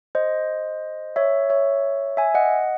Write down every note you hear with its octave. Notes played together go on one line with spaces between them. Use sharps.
C5 D#5
C#5 E5
C#5 E5
E5 G#5
D#5 F#5